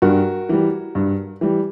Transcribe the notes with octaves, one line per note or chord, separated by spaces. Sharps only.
G2 F#4 A#4
E3 G3
G2
E3 G3